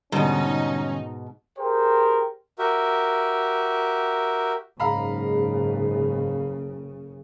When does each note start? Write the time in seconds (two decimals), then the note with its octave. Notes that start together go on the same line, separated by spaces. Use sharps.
0.12 G#2 B2 D3 E3 G3 C#4 D#4
1.59 G4 G#4 A#4 C5 G5
2.59 F#4 G4 A#4 E5
4.80 F#1 G#2 C#3 F5 A#5 B5